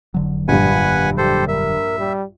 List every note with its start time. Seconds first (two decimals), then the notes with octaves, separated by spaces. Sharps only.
0.14 F1 D3 F#3
0.48 A#1 G2 B4 F#5 G#5
1.18 G4 A4 C5
1.48 A#4 E5
1.99 G3